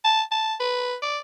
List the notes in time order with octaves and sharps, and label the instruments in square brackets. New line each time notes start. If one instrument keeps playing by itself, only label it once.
[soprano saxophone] A5
A5
B4
D5